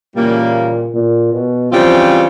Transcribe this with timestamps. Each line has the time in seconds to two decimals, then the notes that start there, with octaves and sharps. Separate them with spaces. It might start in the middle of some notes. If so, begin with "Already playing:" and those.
0.15 A#2 C#3 E3 G3 A#3
0.94 A#2
1.33 B2
1.72 C#3 E3 F3 G3 C4 F4